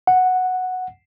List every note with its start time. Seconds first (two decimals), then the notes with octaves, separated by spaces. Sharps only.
0.07 F#5